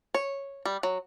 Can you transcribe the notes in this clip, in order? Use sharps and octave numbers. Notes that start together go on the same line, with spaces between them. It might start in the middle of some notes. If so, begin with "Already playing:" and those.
C#5
G3
F#3